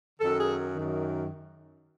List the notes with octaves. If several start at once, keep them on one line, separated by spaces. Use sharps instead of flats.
F#2 D#3 A4
G#4
F#2 D#3